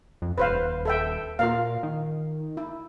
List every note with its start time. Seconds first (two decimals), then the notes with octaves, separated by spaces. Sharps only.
0.22 F2
0.38 D#1 B4 C5 F5
0.85 A4 E5 G5
1.39 A#2 F4 A#4 F5
1.83 D#3
2.57 E4